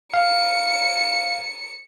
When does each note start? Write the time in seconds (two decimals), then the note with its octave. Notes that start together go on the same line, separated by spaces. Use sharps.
0.14 F5 C#7